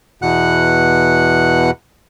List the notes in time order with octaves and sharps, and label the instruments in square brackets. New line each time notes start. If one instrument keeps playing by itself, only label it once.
[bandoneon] E2 B2 F#5 F#6